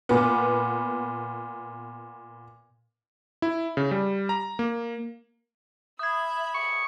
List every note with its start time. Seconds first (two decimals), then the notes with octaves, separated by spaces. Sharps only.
0.09 A#2 B3
3.42 E4
3.77 C#3
3.91 G3
4.29 A#5
4.59 A#3
5.99 E5 B5 D#6 G#6
6.54 C#6